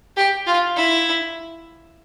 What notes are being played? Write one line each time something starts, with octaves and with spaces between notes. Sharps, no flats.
G4
F4
E4